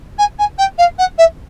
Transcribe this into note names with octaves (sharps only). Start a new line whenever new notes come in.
G#5
G#5
G5
F5
F#5
E5